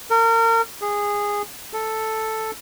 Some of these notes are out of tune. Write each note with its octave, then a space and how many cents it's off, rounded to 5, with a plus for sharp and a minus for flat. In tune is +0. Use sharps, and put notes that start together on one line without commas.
A#4 -35
G#4 -15
A4 +0